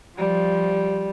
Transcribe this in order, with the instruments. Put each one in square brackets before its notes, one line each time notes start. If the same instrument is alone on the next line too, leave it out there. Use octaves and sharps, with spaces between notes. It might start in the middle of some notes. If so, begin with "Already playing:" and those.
[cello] F3 [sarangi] G3